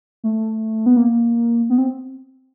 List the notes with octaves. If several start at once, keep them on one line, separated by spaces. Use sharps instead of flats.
A3
B3
A#3
B3
C4